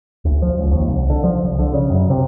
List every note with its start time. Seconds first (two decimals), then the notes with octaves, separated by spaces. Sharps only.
0.25 D2
0.42 F3
0.58 C#2
0.71 D#2
0.87 C2
1.10 D3
1.24 F3
1.42 C2
1.59 D3
1.73 C#3
1.90 F#2
2.10 C3